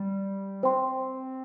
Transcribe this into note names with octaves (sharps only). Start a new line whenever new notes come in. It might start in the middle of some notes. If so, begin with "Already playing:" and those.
Already playing: G3
C4 C5 G5 C6